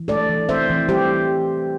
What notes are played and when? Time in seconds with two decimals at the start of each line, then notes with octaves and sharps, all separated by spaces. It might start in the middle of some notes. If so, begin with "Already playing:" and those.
Already playing: E3
0.08 A3 A4 D5
0.29 E3
0.49 C4 C5 E5
0.70 E3
0.89 G3 G4 C5